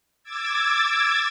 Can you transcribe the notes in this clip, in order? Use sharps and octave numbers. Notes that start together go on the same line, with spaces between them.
D6 E6 G#6 A6